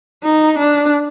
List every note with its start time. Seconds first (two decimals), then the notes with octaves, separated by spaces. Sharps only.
0.24 D#4
0.58 D4